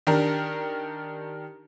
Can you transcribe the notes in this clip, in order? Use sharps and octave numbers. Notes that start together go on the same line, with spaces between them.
D#3 D4 G4 A#4